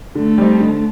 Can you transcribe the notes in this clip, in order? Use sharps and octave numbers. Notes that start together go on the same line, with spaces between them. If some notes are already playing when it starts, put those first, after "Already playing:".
D3 A3
G3 C4 D#4
D3